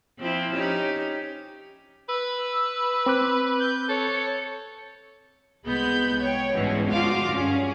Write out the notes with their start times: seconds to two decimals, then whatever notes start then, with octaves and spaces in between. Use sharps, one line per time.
0.19 F3 C4 E4
0.54 C#4 D#4 G4
2.09 B4 E6
3.06 C4 D6 F#6
3.60 G6
3.89 A4 C#5
5.65 C2 G#3 B3 B5 G6
6.19 C#5 G5
6.54 G#1 G2 B2 E3 G#3 C#4
6.88 D2 F3 F4 F#4 F5 D6
7.32 G2 C#4 G#4